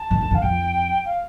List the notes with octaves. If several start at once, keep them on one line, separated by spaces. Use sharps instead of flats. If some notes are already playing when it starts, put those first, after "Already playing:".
Already playing: A5
D#3
D3
D3
F5
F2 G5
F5